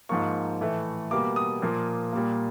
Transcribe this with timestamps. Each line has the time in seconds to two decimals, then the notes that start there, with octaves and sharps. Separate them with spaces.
0.09 G#2 F3 A#3 C#6
0.61 A2 E3 A3
1.11 B2 G3 A#3 D6
1.36 D#6
1.62 A#2 F3 A#3
2.13 A#2 G3 A#3